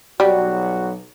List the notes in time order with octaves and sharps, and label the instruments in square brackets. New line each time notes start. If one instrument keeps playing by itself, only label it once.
[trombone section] B1 F#4 [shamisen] G3